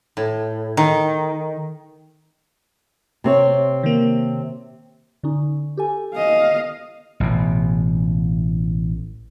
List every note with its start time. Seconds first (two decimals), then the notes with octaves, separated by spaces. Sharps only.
0.17 A2
0.77 D#3
3.24 C3 C4 C#5
3.83 D#3 A#3
5.23 D3 C#4 D#4
5.77 G4 A4 G#5
6.14 D#5 F5
7.20 A1 B2